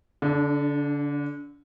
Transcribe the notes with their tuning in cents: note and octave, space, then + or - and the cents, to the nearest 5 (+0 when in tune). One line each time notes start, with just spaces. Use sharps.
D3 -30 D4 +15